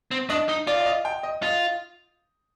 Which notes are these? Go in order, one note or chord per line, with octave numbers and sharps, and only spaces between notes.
C4
D4 D#5
D#4
F4 D5
D5
D#5
G5
D#5
F4 D#5